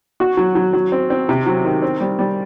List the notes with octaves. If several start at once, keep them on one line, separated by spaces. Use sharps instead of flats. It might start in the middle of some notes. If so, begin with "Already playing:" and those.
F#4
F#3
F#3
F#3
C4
C4
C3
F#3
D#3
C4
G3
G3